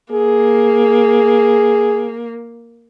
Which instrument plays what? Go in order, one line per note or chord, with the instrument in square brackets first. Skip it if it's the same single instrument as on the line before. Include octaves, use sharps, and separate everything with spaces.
[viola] A#3 [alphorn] G#4